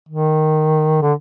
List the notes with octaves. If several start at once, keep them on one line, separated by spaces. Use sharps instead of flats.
D#3
D3